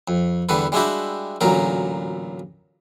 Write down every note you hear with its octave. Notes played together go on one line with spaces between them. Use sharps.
F2
E2 D3 G3 A4 B4
G3 G#3 D4 E4 F#4 G4
A1 D2 A#2 F#3 A#4